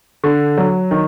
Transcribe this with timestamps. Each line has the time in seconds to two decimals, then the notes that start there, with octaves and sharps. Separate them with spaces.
0.24 D3
0.58 F#3
0.91 D#3